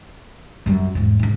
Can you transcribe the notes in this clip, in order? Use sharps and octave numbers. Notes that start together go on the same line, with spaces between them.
F#2 G3
E2 G#2
G#2 C#3